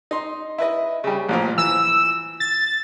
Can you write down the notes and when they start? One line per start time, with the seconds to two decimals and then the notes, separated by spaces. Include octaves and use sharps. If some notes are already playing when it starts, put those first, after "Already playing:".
0.11 D#4 C6
0.58 E4 B4 D#5
1.04 C#3 G3
1.29 A1 A#2 F3
1.58 E3 E6
2.40 A6